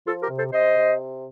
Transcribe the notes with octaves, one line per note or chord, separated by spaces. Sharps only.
F3 F4 A4
G4 A#4
C3
A4 C5
C3 C5 D#5
C3